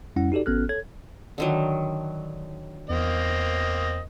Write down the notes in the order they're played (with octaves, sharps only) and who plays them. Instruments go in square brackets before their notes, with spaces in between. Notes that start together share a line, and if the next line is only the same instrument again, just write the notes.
[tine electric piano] F2 G3 C#4 E4 F#5
D#4 F#4 G4 A4 D5
G#1 B3 C#4 A4 F6 F#6
A4 C#5 G#6
[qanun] D3 D#3 F#3
[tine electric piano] E2 [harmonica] A#3 C4 D#5